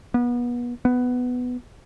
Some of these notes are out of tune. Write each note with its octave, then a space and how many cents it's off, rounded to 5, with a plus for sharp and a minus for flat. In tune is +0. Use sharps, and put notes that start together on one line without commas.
B3 -30
B3 +10